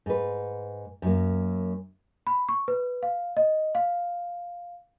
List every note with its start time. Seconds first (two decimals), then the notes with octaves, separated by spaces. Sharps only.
0.06 G#2 B4
1.02 F#2 F#3 A#3
2.27 B5
2.49 C#6
2.68 B4
3.03 F5
3.37 D#5
3.75 F5